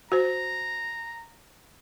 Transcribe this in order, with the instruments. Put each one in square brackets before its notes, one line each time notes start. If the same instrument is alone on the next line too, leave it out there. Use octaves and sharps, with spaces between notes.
[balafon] F#4 C5 [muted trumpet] A#5